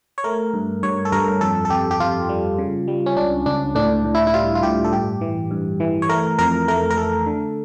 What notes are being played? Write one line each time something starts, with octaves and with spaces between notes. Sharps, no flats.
C#5
A3 A#4
G2
G2 C#5
A4
G2 A#4
F2 A4
A4
F2 G4
G4
F2 F4
G3
C#3
G3
C#4
C#2 D4
C#2 D4
A2 D4
A2
E4
E4
G3 F4
F4
A2 G4
A4
G2 G4
E3
G2
E3
C#5
A3 A#4
F2 A#4
A3 A#4
A#4
A3 A4
D3